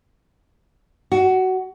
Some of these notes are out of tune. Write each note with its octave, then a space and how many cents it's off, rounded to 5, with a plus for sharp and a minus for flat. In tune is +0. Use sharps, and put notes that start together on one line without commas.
F#4 +15